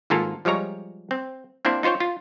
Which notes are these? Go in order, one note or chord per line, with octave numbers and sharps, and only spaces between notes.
G#1 G#2 A#3 F4 A4 A#4
F3 G3 G#3 C#5 A#5
C4
A#3 C4 D4 E4 C5
D#4 F4 C5 C#5 G5
F4